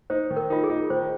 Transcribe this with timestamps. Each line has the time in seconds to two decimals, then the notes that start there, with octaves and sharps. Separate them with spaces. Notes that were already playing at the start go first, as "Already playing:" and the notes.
0.10 D#4 C5
0.30 D#3
0.36 A#4
0.50 D#4 F4
0.64 G#4
0.70 D#4
0.90 D#3 C5